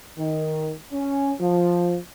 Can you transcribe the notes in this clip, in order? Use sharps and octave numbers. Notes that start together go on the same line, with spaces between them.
D#3
C#4
F3